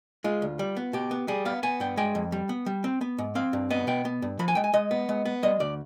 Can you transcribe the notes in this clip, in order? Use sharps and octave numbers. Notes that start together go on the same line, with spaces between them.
G#3 F4
D2
G3
B3
B2 G4
B3
G3 G#4
B3 F5
B3 G#5
G2 G5
G#3 G5
F2
G3
B3
G3
C4
B3
G#2
C4 F5
G2
B3 D#5
B2 G5
B3
G2
F3 B5
G#5
G#3 G5
G#5
G#3 D#5
B3
G#3
B3
G3 D#5
D2 D5